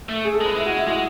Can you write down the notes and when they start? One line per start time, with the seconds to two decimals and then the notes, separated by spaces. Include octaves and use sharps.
0.09 A3
0.24 G#4
0.34 A4
0.41 G#3 B4
0.55 G#3 E4
0.66 F#4
0.77 E4
0.87 G#3 F#4